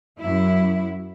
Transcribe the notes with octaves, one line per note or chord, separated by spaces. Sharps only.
F#2 F#3 E4